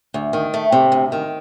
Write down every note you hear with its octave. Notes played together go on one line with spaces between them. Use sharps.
D2
D#3
A3
C3
D2
D#3